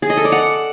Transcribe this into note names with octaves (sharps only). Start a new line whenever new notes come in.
G#4
D#5
A4
D5
F#5